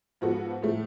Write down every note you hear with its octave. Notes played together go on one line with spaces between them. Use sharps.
G#2 F3 B3 F#4 A4
A2 F3 A3